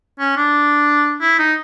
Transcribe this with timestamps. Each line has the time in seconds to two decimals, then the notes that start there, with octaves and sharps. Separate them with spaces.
0.19 C#4
0.36 D4
1.21 E4
1.39 D#4